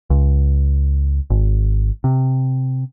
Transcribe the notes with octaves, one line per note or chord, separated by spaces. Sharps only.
C#2
G#1
C3